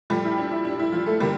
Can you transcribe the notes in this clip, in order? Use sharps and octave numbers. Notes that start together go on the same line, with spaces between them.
A#2 F3 G3 A3 G4
E4
D4
E4
D4
E4
F3 F4
A3 A4
D3 G3 A#3 A#4